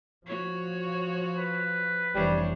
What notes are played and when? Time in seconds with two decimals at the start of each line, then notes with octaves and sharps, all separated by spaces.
0.26 F3 F#4 C#5
1.38 B4
2.15 F1 E3 G3 D4 C5 C#5